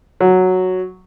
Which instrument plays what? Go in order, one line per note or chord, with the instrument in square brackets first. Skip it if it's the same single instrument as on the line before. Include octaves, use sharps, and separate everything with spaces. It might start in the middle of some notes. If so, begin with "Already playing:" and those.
[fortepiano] F#3